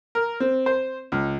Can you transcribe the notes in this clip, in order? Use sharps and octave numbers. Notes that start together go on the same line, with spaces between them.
A#4
C4
C5
C#2